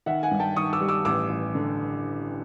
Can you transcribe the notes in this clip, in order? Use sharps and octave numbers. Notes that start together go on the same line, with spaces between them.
D#3 E5 F#5
F#5 G#5
G2
G5 A5
D#3 C#6 D#6
D6 E6
G3
D6 E6
A1 D6 E6
A1
D3